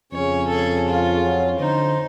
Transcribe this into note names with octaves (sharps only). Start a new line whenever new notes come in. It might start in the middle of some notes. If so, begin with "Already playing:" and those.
F2 C#3 C#4 C#5
G#4 A4
F4
F#3 C#4
D3 D#4 C5